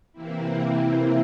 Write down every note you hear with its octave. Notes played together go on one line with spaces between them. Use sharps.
C3 E3 A#3 C4 E4